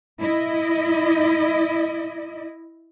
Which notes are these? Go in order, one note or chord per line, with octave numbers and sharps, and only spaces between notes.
E4 D#5